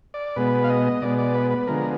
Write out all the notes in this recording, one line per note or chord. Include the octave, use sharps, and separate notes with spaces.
D5
B2 G#3 B3 B4
F5
D#5
B2 G#3 B3 D5
D5
B4
B4
D3 F3 G#3 B3 A#4